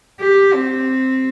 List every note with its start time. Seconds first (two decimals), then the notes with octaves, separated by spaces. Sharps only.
0.20 G4
0.54 C4